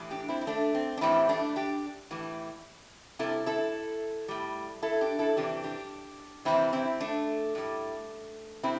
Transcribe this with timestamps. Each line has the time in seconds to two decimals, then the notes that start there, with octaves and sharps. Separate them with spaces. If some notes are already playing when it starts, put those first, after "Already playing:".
Already playing: A2 E3 G3
0.11 D4 G4
0.28 C4 E4
0.41 E4
0.47 A3 D4
0.75 C4
0.97 D4
1.01 A2 E3 G3 C4 E4
1.29 A3 D4
1.56 D4 G4
2.11 A2 E3 G3
3.19 C3 G3 E4 A4
3.46 E4 A4
4.28 A2 G3
4.82 E4 A4
5.01 D4 G4
5.19 E4 A4
5.37 C3 E3 G3 D4 G4
5.64 D4 G4
6.45 C3 E3 G3 C4 E4
6.73 C4 E4
7.00 A3 D4
7.55 A2 G3
8.63 C3 C4 E4